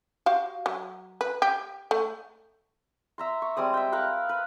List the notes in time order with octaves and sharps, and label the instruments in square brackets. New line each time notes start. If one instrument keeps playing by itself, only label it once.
[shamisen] F#4 G4 F5
F#3
B4
G4
A3
[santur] E5 A#5 C6
C#6
G3 G#3 C4 D#6
E5 G5
A#4 F5 F#5 B5
B4